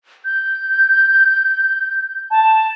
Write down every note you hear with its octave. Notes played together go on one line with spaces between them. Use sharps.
G6
A5